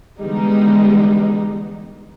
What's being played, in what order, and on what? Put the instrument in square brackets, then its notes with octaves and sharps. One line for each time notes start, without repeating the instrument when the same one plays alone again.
[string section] D3 E3 G3 G#3 B3 D#4